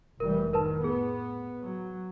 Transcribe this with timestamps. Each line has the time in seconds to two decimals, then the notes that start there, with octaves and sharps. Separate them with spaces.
0.20 F1 E3 G3 A#4
0.53 A2 D#3 A#4 B4 A5
0.84 B3 G#4
1.61 F#3